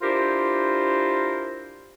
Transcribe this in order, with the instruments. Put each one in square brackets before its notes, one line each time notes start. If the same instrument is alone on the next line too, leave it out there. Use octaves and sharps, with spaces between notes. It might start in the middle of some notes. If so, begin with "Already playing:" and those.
[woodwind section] D4 E4 F4 G4 A#4 C5